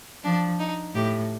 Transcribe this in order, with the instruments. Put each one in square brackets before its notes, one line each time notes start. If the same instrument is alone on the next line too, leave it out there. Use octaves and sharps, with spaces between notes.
[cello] F3 [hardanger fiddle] D4
[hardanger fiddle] D#4
[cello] A2 [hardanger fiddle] G4